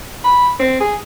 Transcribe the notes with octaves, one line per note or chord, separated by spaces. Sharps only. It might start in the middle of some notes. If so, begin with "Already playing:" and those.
B5
C4
G#4